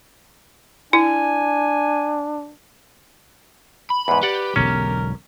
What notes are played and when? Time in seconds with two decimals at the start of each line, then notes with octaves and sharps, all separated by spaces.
0.93 D4 E4 G#5
3.90 B5
4.08 E2 G#2 B4
4.23 G4 D5 F#5
4.56 E1 B1 D3 C#4 A#4